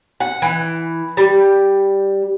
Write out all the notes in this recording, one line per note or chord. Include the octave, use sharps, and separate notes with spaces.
F#5
E3
G3